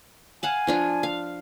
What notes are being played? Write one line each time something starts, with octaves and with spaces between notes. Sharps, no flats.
F5 F#5 G#5 A5
F3 D4 F4
F5